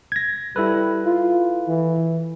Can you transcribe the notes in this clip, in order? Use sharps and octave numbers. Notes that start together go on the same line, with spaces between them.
G#6 A#6
G3 E4 A4 B4
F4
E3